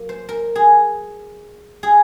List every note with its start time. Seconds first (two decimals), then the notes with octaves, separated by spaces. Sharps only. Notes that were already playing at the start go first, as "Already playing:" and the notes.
Already playing: F#3 A#3
0.09 C5
0.29 A#4
0.56 G#4
1.83 G#4